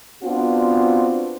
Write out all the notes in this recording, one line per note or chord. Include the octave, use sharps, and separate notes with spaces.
B3 C4 D4 F4 F#4